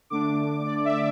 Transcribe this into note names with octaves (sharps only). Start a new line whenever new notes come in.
D3 A3 D4 D6
D5
E5